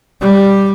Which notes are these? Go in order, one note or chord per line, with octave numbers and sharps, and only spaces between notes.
G3